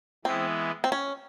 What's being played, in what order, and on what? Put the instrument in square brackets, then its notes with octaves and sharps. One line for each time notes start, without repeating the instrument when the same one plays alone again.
[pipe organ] E3 G#3 B3 E4 [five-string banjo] C4
[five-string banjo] C4
C#4